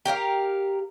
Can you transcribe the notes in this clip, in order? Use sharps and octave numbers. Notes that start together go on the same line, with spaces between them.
G4 A#4 D5 F5